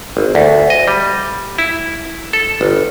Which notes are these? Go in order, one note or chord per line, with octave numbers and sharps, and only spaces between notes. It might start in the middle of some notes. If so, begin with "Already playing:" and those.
G#1
D2
D#5
G3
E4
A4
G1